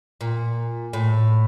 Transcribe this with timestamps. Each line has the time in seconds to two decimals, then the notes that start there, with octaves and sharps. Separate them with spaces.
0.21 A#2
0.93 A2